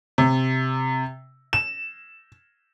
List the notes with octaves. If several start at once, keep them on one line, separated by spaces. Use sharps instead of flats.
C3
E7